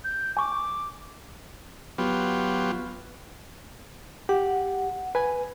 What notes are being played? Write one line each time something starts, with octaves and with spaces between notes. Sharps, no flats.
G6
G#5 C#6 D6
F#3 B3 F4 G4
G4 F#5
B4 G#5